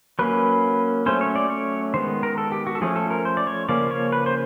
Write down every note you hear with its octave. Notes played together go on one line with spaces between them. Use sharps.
F#3 A#3 C#4 B4
F#3 A3 C#4 C5
C#5
D5
C#5
D#3 G#3 B3 C5
A#4
A4
G4
F#4
A4
F3 A3 C#4 G#4
A4
A#4
C5
D5
C#5
C#3 F3 A#3 C#4 D5
C#5
B4
C5